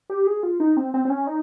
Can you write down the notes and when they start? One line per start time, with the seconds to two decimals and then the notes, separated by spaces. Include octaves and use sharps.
0.10 G4
0.27 G#4
0.43 F4
0.60 D#4
0.77 C4
0.94 C4
1.05 C4
1.10 C#4
1.27 D#4